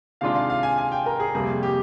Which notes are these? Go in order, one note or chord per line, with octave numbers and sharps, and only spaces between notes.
C3 D#3 G#3 D4 F4 F5
F5
F5
G#5
G#5
G5
A#4
G#4
F2 C3 G3 A#3 G#4
G4